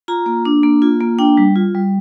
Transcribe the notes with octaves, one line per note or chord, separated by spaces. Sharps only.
F4 A#5
A#3
D4
A#3
F4
A#3
D4 G5
G3
F4
G3